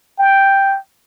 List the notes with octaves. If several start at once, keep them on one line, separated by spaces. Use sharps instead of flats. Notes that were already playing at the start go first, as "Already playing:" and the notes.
G5